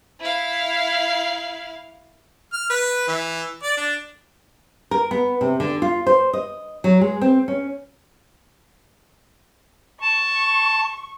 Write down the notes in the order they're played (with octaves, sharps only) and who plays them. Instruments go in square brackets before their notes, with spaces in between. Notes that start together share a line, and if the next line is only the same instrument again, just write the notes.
[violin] E4 F5
[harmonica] F6
B4
E3
D5
D4
[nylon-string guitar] A#4
B3
C3
D3
F4
C5
D#5
F#3
G#3
C4
C#4
[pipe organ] A5 [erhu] C#6